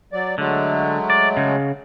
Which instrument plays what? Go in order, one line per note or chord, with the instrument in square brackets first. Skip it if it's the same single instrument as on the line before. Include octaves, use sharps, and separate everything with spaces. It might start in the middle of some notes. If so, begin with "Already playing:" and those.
[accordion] F#3 D5
[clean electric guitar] D3 [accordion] F#3 G#3 A3
[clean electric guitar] D5
C#3